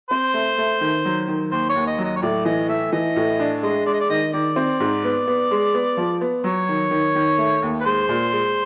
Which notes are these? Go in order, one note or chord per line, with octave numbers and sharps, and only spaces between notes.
C4 C5
A3
A3
D#3
F#3
D#3
D#2 C5
C#5
D#2
D#5
F#3
D#5
C#5
A2 D5
E3 D#5
A3 E5
E3 D#5
A2
D4
G#3 D#5
G#3 D5
D#5
D5
D#3 D#5
D#3 D5
C4
G#2
B3
B3
G#3
B3
F3
B3
F#3 C#5
D#3
D#3
D#3
A3
D#2
B4
G#3 C5
A#2
G#3